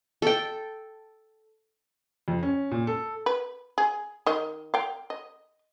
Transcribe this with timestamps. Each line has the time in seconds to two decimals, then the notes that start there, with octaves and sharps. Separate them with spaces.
0.22 A4 G5
2.28 F2
2.43 C#4
2.71 A#2
2.87 A4
3.26 B4
3.78 G#4
4.26 D#3 D#5
4.74 F5 G5
5.10 D#5